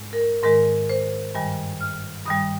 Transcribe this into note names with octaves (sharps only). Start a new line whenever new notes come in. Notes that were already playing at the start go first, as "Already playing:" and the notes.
Already playing: G#2 G#3
A#4
G#2 D#3 G#3 A#4
C5
G2 D#3 G3 G#5
F6
G2 D#3 G3 D#6